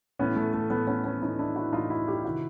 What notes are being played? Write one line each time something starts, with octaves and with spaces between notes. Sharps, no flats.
A2 E3 B3 C#4
A3
A3
A2 E3 A3 B3
B3 C#4
B3 C#4
A2 E3 C#4 D#4
D4 E4
E4 F#4
A2 E3 D#4 F4
E4 F#4
F4 G4
C3 D#3 E4 F#4